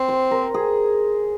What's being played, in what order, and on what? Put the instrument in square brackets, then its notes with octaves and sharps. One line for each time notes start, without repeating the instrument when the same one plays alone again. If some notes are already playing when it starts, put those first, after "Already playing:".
Already playing: [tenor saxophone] C4
[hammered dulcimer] C5
A#4
G#4